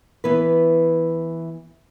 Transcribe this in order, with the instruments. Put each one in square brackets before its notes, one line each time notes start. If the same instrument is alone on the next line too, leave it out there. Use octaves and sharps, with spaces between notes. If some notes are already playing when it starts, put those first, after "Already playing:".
[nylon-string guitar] E3 B3 E4 B4